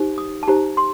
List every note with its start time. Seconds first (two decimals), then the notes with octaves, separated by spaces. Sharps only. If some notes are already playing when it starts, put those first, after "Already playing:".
Already playing: D#4 G4 C5
0.18 D#6
0.43 A5
0.48 D#4 G4 C5 A#5
0.77 C6